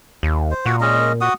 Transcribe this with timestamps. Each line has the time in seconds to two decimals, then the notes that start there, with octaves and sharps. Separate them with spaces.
0.23 D#2
0.51 C5
0.66 A#2 F#4 F#5
0.81 G#3 C#4 D#5
1.21 F#4 F#5 D#6